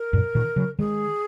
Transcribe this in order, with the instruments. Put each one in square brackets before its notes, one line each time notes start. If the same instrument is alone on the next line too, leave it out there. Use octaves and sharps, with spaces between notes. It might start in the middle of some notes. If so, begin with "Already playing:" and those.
Already playing: [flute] A#4
[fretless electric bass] F#2 A#2
A#2 D#3
C#3 F#3
[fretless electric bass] D#3 G#3 [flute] G#4